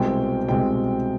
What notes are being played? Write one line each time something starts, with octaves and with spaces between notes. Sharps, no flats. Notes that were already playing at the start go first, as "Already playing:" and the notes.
Already playing: C2 B2 G#3 C4 G5
C2 B2 G#3 C4 G5